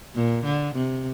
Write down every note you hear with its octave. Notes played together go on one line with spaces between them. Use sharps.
A#2
D3
C3